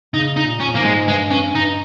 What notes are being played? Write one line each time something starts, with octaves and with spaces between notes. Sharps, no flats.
C#3 D#4
D#4
A#2
C#4
G#2 A#3
G#3
G2 G#3
G2 C#4
G2 D#4